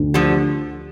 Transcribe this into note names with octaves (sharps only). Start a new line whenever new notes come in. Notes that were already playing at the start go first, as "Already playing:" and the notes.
Already playing: D2
D3 F3 G4